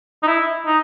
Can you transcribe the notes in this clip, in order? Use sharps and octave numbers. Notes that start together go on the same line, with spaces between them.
D#4
E4
D#4